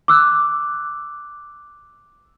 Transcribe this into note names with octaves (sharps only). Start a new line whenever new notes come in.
D6 E6 F#6